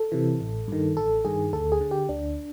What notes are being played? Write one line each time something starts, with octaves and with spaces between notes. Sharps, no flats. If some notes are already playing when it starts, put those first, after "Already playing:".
Already playing: A4
C3 E3
A1
G2 D#3
A1 A4
G2 D#3 G#4
D2 A4
G#4
D3
G4
D2 D4